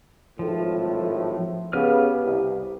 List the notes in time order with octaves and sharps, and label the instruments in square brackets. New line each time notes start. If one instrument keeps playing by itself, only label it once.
[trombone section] G#1 A2 [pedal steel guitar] F3
[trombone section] C#3 B3 [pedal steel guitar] G4 B4 F6
[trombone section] C2